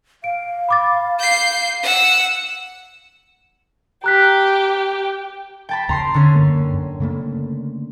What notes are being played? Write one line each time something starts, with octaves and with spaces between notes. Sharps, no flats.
F5 D7
B5 D6 A6
G6 C7
F#5 E6
G4 A#5 F#6 B6
G5 A5 B5
D#2 C#3 A#5 C6 C7
D3 C#4
F#2 A#3
F#2
C#3 A3 A#3